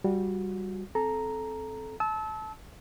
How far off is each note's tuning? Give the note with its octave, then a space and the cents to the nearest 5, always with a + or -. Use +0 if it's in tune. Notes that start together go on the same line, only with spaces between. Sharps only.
G3 -5 F#4 -25
C4 +0 A4 -20 A#5 +0
A5 -20 E6 -30